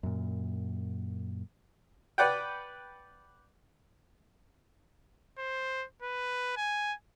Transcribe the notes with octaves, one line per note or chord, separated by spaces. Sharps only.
F#2 A#2
B4 D5 F#5 G5
C5
B4
G#5